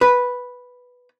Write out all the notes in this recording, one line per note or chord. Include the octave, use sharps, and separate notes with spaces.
B4